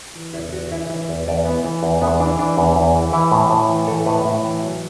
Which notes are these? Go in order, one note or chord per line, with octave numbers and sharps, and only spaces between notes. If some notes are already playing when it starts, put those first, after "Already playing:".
E3
E2 E4
E2 F#4
E3 E4
E3 E4
E2
E2 D5
E3 B3
E3
E2
E2 B3
E3 D4
E3 D4
E2
E2
E3
E3 E4
A2
A2
E3
E3 A4
A2 B4
A2
E3
F#3